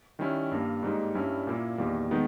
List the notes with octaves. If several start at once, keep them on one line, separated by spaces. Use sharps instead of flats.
D#3 G3 C#4 E4
G2 G3 A#3
G#2 G3 A#3 D#4
G2 G3 C#4 E4
A#2 A#3 E4
E2 D#3 G3 A#3
D#3 G#3 B3 D#4